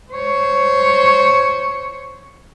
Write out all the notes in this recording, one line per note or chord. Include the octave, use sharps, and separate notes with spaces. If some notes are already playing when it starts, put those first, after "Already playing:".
C5 C#5